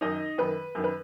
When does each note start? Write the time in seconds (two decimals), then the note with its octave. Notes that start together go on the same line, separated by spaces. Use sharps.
0.01 F#2 D#3 D#4 D#5
0.38 F#2 D#3 B4
0.75 F#2 D#3
0.84 B4